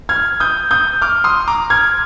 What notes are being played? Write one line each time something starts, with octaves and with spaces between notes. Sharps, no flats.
F6 G#6
D#6 G6
D#6 G6
D6 F6
C6 D#6
A#5 D6
F6 G#6